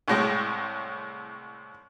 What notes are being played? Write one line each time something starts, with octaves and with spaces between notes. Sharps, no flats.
C2 A2 G#3